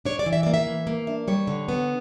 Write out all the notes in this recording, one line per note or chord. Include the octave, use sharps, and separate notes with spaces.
D4 C#5
D5
E3
E5
A#3 D5
E5
E3
A#3
D4
G3 C#5
D3
B3